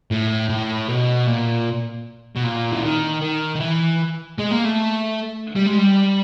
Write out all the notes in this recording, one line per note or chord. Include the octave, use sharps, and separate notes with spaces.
A2
A2
B2
A#2
B2
A#2
E3
D#3
D#3
D#3
E3
G#3
A#3
A3
G3
G#3
G3